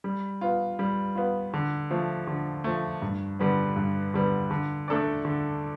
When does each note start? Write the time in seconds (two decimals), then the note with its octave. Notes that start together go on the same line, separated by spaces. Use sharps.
0.04 G3
0.41 B3 F4
0.79 G3
1.15 B3 F4
1.54 D3
1.91 F3 A3
2.27 D3
2.64 F3 A3
3.02 G2
3.39 D3 G3 B3
3.76 G2
4.14 D3 G3 B3
4.51 D3
4.88 A3 D4 A4 D5
5.25 D3